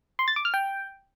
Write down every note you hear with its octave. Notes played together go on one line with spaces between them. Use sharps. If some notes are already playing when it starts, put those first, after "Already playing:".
C6
A6
D6
F6
G5